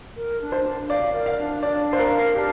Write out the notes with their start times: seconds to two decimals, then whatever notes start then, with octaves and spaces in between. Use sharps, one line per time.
0.16 A#4
0.40 D4
0.52 C5
0.64 D4
0.89 D5 F5
1.13 A#4
1.26 F5
1.38 D4
1.63 D4 D5
1.87 F5
1.93 C5
1.99 A#4
2.12 A#4
2.35 D4 G4